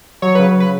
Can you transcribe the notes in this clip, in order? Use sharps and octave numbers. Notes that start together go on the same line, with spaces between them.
F#3 C#5
C#3 B4
B4